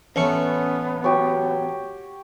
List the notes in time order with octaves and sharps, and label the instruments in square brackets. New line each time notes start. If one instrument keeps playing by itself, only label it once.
[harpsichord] A1 A3 C#6 [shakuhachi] B3 [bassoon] C#4
[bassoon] F#3 [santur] F#4 G4 C#5